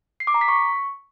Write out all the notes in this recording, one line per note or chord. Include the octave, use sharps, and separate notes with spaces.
C7
D6
A#5
B6
C#6